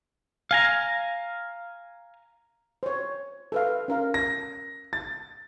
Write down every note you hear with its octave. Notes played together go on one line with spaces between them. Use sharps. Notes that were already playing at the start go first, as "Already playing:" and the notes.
F5 G#5 A#5
C5 C#5
A4 B4 F5
C#4 A#4 F5
A#6
A6